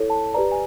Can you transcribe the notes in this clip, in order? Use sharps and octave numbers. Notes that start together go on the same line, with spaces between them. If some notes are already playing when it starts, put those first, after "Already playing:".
Already playing: E4 A4 C#5
A5
G4 B4 D5 A#5
G#5